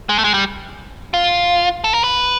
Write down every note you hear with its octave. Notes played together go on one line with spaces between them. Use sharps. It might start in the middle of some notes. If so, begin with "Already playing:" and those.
G#3
A3
G#3
G3
F4
A4
A#4
B4